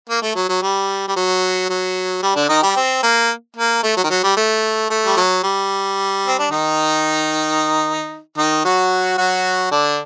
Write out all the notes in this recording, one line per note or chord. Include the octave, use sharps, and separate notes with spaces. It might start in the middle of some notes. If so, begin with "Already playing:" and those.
A#3
A3
F#3
F#3
G3
G3
F#3
F#3
G3
D3 D4
D#3 D#4
G3 G4
C4
A#3
A#3
A3
F#3
D#3
F#3
G3
A3
A3
G3
F#3
G3
C4
D4
D#3 D#4
D#3 D#4
F#3 F#4
F#3 F#4
D3 D4